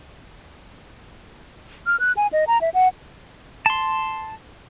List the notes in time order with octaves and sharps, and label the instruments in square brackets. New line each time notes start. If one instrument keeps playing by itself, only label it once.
[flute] F6
F#6
G#5
D#5
A#5
E5
F#5
[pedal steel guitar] A5 C6